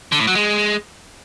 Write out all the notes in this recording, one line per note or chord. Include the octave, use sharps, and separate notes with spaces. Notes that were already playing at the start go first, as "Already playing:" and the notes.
D3
A2
F#3
G#3